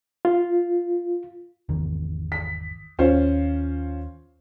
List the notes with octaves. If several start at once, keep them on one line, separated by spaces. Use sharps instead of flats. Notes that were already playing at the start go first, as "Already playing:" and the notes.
F4
G#1 E2 D#3
B6
D#2 C#4 F4 C5